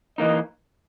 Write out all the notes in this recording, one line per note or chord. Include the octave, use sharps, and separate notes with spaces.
E3 A#3 D#4 D#5